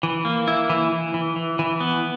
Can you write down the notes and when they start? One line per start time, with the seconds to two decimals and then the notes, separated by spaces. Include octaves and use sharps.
0.03 E3
0.25 A#3
0.48 E4
0.70 E3
0.92 E3
1.14 E3
1.36 E3
1.59 E3
1.81 B3